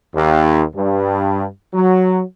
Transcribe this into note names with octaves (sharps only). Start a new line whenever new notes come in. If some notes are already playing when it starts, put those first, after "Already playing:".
D#2
G2
F#3